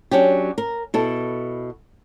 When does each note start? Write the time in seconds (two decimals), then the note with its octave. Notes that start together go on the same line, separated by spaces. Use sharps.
0.11 F#3 C#4 D4 G4
0.58 A#4
0.94 B2 E4 A4